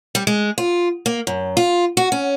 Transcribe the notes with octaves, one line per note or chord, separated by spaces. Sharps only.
G3
G#3
F4
A#3
F#2
F4
F#4
C#4